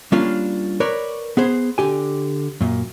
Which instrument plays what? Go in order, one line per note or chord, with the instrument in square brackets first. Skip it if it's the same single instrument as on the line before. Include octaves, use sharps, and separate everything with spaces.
[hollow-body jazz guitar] G3 A#3 C#4 D4 F4 F5
A#4 B4 C#5 D5
B3 G#4 C5
D3 G4 G#5
F#2 A#2